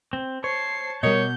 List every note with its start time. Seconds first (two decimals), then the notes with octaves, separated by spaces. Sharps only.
0.13 C4
0.44 C5 C#5 A5 C7
1.03 B2 G3 A#4 C#5 D#5 G6